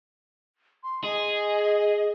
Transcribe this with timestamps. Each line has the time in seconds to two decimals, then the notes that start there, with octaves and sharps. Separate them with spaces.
0.84 C6
1.04 G#4 D#5